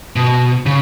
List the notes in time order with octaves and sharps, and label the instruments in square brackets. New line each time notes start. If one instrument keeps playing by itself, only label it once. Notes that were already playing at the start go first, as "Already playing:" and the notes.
[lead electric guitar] B2
C#3